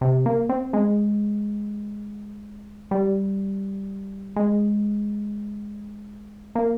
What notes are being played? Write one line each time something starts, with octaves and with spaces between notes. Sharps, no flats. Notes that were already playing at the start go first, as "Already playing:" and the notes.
C3
A#3
C4
G#3
G3
G#3
A#3